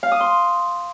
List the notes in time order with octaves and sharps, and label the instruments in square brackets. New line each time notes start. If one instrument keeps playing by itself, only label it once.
[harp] F5
D#6
C6